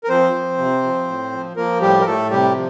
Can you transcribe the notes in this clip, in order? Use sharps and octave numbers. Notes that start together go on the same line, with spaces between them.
A#4
F3 C4 C5
F3
C3
F3
A2
F3
F3 A#3 A#4
A2 G3 G4
A#4
A2 A3 A4
C3 G3 G4
F3